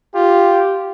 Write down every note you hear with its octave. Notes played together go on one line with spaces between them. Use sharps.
F4 G4